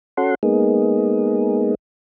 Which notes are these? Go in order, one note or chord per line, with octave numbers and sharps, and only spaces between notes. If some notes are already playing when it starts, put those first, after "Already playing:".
C#4 F#4 A4 F#5 C6
G#3 A#3 B3 D#4 G#4